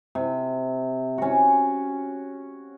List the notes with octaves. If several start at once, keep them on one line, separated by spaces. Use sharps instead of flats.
C3
C#4 F#4